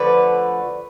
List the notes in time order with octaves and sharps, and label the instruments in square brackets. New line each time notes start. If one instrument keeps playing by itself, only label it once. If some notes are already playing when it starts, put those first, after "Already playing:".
Already playing: [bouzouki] D3 F3 A3 B4 D5